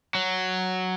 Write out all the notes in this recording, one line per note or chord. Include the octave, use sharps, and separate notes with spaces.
F#3